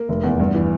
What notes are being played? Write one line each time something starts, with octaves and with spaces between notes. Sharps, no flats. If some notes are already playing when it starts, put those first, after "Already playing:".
Already playing: A#3
F1
E2
G2
E3